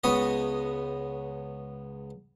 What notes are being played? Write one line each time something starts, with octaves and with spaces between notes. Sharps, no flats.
C#2 B3 C#5 D#5